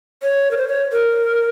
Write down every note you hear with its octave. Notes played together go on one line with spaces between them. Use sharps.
C#5
A#4
C5
C#5
A#4